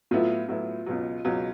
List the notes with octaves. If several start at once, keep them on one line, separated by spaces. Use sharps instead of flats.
A2 F#3 B3 E4 F4
A2 F#3 B3 E4
C#2 B2 F#3
C#2 B2 F#3